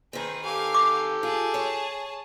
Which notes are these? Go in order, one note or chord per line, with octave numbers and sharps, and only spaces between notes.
D#3 C4 G#4 B4
G4 A4 F5 G#5
D6
F4 G#4 A5
C#5